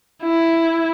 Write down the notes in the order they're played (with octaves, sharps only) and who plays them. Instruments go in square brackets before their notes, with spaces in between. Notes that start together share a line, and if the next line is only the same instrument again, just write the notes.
[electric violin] E4